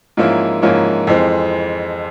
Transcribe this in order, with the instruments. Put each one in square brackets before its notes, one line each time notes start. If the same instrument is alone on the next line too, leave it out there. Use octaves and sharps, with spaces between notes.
[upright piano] G#2 F3 A#3 C#4 E4
G#2 F3 A#3 C#4 E4
F2 E3 G#3 C4